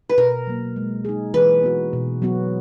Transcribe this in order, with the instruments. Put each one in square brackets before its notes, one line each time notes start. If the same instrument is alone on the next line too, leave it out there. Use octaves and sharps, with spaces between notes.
[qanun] B4
[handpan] B2 [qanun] A#4
[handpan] F#3 A#3
G#3
D#4 G#4
[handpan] E3 [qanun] B4
[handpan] B3 F#4
B2
F#3 B3 F#4